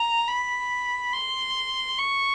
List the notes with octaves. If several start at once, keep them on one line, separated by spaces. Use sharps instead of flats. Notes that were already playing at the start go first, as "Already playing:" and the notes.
Already playing: A#5
B5
C6
C#6